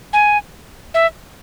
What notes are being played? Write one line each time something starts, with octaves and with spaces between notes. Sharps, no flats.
G#5
E5